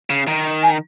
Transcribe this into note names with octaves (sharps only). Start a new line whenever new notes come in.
C#3
D#3
G#5